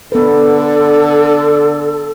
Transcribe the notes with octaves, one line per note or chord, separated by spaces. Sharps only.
D3 B3 A4 B4